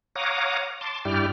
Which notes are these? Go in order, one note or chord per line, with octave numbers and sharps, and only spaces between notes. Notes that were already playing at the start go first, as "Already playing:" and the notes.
C#5 F5 F#5 A#5 D6 D#6
A5 C6 D6
G2 E4 G4 D5 G5 F6